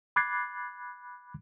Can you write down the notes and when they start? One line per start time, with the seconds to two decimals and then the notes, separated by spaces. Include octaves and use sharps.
0.16 B5 D6 F#6 G#6 A6 C7